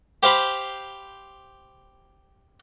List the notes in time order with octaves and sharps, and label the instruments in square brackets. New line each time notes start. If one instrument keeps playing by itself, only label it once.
[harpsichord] G4 C5 F5 B5 C6